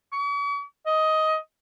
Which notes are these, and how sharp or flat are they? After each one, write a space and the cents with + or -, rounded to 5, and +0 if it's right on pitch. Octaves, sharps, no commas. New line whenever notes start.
C#6 +45
D#5 +15